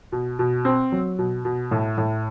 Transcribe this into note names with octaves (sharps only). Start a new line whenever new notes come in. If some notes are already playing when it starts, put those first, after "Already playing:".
B2
B2
C4
F#3
B2
B2
A2
A2